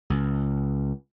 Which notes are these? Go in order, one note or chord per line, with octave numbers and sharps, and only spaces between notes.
C#2